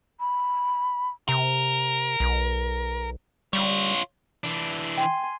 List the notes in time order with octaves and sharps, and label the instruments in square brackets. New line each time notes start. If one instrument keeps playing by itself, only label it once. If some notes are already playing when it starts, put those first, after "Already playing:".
[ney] B5
[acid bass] C3 [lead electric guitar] A#4
[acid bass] B1
[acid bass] G3 [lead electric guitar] F4 C#5
[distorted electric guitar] E3 D4
[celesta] G5 [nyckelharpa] G#5 C6